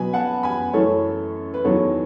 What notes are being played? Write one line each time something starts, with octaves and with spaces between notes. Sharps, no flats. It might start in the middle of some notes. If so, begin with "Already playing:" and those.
Already playing: B2 F#3 B3 G#5 B5
F#5 A5
G#5 B5
F#2 E3 A3 A4 C#5
B4
E2 D#3 F#3 B3 A4 C#5